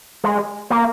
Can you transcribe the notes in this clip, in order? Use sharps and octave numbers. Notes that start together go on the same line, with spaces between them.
G#3
A#3